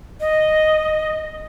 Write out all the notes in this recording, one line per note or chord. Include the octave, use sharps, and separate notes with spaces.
D#5